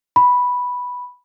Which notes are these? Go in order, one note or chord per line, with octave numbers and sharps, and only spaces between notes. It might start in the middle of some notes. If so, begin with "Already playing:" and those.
B5